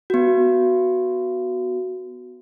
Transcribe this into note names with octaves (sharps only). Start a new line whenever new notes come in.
B3 F#4